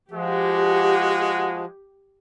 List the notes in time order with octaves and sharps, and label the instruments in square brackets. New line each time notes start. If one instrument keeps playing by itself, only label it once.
[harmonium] F3 [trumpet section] G#3 F#4 F#5 [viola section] G4